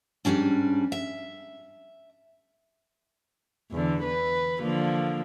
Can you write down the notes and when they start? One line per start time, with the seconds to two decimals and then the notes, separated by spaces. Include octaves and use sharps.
0.25 G#2 F3 G3 C#4 D4
0.92 E5
3.71 E2 D3
4.03 B4
4.60 D3 F3 A#3